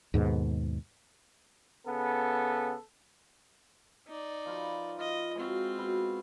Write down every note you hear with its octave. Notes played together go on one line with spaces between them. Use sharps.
D#2 G#2 B2
C#3 B3 A4
D#4 D5
F3 F4 B4
F4 D#5
G#3 C4 F4 F#4
B2 B5